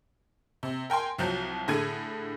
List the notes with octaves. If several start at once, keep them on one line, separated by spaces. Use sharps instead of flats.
C3
A#4 G5 G#5 C6
C2 F3 F#3 G6
A2 D3 G#4 G#6 D#7